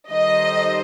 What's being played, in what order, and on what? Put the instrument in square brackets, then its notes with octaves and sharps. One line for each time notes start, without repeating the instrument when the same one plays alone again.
[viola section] D#3 G3 D#4 A4 C5 [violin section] D#5